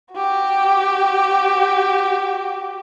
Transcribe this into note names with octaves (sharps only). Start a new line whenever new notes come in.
F#4 G4